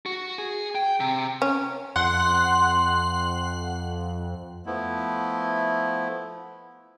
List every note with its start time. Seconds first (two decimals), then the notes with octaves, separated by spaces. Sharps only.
0.06 F#4
0.38 G#4
0.75 G5
1.00 C3
1.42 C#4
1.96 F2 F#5 C6 F#6
4.66 F3 A3 B3 E4